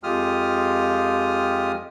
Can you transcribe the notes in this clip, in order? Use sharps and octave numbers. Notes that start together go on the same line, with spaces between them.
F2 G#3 F4 G4 D#6 F6